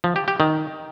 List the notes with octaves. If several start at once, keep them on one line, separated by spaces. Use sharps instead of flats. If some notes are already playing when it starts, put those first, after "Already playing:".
F3
G4
G4
D#3